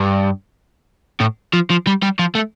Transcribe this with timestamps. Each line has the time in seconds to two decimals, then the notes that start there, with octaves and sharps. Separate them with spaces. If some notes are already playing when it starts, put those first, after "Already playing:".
Already playing: G2
1.21 A2
1.53 F3
1.70 F3
1.87 G3
2.03 G3
2.19 F3
2.35 A3